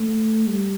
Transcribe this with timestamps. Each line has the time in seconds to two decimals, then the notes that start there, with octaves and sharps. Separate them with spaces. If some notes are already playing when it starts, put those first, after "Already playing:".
Already playing: A3
0.47 G3